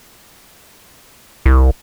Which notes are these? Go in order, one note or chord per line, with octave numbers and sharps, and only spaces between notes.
C2